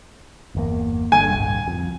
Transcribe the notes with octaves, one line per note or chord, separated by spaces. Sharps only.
G1 E2 A#3
G1 G2 D3 G#5
D1 G1 C2
F2